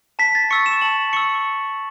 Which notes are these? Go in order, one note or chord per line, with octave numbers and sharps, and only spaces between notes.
A5 B6
A6
C#6 E6 C#7
E7
A5 F#7
C#6 E6 C#7